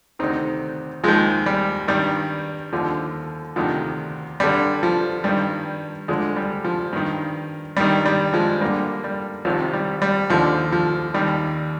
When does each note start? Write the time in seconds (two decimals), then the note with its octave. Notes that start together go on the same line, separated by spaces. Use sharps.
0.19 D2 C3 D#3 C4 D#4
1.04 D#2 D#3 F3 G#3
1.46 G3
1.88 G2 D#3 G3
2.73 D#2 D3 F3
3.56 D2 C3 D#3 F3
4.40 G2 D3 G3
4.83 F3
5.24 G2 D#3 G3
6.08 D2 D3 F3 G#3
6.36 G3
6.65 F3
6.93 G2 D#3
7.77 G2 D#3 G3
8.06 G3
8.33 F3 G#3
8.61 G2 D3 G3 A#3
9.04 G3
9.45 C2 C3 D#3 F3
9.73 G3
10.02 G3
10.30 D#2 D3 F3
10.72 F3
11.14 D#2 D#3 G3